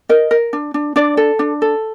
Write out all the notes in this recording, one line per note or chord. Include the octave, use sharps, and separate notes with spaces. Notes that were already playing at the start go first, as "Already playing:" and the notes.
A#4 D#5
A#4
D4
D4
D4 D5
A4
D4
A4